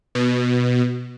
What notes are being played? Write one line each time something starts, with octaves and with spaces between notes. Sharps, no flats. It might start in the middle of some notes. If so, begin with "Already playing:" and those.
B2